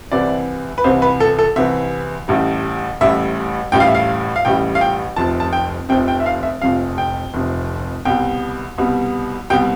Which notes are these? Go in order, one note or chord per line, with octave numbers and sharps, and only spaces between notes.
C2 C3 E3 D5
B4
C2 C3 E3 C5
B4
A4
A4
C2 C3 E3 E5
A1 A2 G3
A1 A2 G3 E5
A1 A2 G3 G5
F5
E5
F5
F5
A1 A2 G3 G5
F5
G5
F1 F2 C3 A5
A5
G5
F1 F2 C3 G5
G5
E5
F5
E5
F1 F2 C3 F5
G5
F1 F2 C3
C2 B2 G3 G5
C2 B2 G3
C2 B2 G3 G5